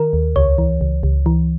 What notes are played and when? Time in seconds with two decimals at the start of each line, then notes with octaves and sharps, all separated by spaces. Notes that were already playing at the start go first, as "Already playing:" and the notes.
Already playing: D#3 A#4
0.13 D#2
0.36 C#2 C#5
0.58 E3
0.81 C#2
1.03 C#2
1.26 E3